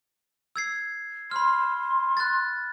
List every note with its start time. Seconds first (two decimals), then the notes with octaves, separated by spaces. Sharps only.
0.56 E6 G#6 C7
1.31 B5 C6 F6
2.17 F#6 A6